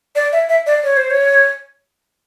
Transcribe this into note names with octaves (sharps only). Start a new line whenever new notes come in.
D5
E5
E5
D5
C#5
C5
C#5